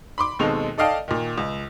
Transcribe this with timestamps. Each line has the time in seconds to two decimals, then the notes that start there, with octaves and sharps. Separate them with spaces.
0.18 B5 C6 D6
0.39 D#2 B2 G#3 C4 A4 F7
0.78 A4 D5 D#5 F5 G5 A5
1.08 A#2 D#3
1.38 C#2